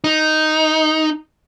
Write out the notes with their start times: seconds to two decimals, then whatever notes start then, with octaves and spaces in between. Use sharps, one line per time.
0.04 D#4